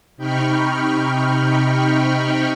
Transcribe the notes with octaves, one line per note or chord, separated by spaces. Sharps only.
C3 D#4 G5 B5 C#6 F6